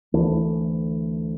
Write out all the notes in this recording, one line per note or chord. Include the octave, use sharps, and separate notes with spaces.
D2 E3 A3